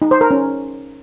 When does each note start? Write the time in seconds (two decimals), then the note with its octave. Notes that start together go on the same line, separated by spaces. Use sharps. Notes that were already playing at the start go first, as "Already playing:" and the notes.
0.02 D#4
0.11 C5
0.21 A#4
0.31 C#4